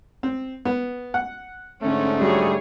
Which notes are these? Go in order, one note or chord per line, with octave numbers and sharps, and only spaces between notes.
C4
B3
F#5
G#2 D3 A3 C#4
F#3 G3 G#4 C#5